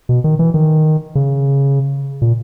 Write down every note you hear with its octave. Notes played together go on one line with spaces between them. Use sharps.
B2
D#3
E3
D#3
C#3
A#2